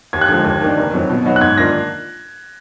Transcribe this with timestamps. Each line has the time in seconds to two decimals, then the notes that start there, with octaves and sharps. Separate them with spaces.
0.13 D#2 G#6
0.21 F#6
0.28 D3 F3 G#3 G#6
0.45 D#2 G#6
0.61 D#3 A#3 D4
0.77 F1
0.93 F2 D#3 F#3
1.10 B2
1.25 F#3 B3 D#4 F#4
1.36 F#6
1.41 G#2 G#6
1.58 D#3 A#3 D4 F4 A#6